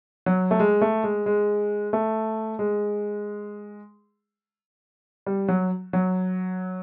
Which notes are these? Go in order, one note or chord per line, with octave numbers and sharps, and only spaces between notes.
F#3
A3
G#3
A3
G#3
G#3
A3
G#3
G3
F#3
F#3